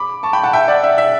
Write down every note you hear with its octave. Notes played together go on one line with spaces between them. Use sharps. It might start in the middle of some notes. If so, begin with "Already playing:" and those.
Already playing: B5 D6
A5 C#6
G5 B5
F#5 A5
E5 G5
D5 F#5
E5
E5